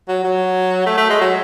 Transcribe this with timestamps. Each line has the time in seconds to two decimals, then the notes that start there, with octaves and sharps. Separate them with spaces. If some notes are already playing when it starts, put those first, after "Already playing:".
0.08 F#3
0.24 F#3
0.86 A3
0.97 A3
1.10 G#3
1.21 F#3